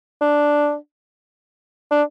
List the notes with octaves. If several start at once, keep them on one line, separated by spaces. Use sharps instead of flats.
D4
D4